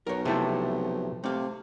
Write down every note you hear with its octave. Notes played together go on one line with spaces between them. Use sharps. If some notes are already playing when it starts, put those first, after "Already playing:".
B1 A#4 C#5
C3 F3 A3 E4 C5 A5
C3 A3 F5